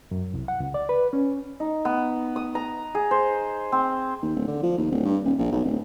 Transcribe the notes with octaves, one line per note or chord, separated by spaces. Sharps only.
F#2
C2
F#5
C#2
D5
B4
C#4
D#4
B3
D#6
A#5
G#4
C5
C4
D#2
D1
D3
F3
D#2
D1
G2
D#1
A#1
B1
D1